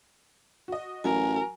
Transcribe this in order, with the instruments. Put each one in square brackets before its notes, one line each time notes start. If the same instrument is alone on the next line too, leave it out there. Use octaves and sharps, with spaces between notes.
[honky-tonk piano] F#4 D#5
[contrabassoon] A1 [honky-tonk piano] F#3 [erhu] A#4 [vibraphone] G#5